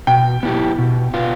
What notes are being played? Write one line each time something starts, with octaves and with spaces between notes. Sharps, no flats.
B2 G5
B3 E4 G4
B2
B3 F4